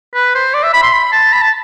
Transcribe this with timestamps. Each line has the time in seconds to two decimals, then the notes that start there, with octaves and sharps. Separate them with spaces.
0.15 B4
0.35 C5
0.54 D5
0.63 E5
0.74 B5
0.83 C6
0.93 B5
1.12 A5
1.33 B5
1.42 A5